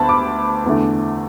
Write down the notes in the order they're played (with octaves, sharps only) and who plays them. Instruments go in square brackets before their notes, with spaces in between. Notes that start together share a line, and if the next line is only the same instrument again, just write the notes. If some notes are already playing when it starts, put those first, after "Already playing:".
Already playing: [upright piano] D2 D3 B3 A5 B5
D6
E2 D3 A3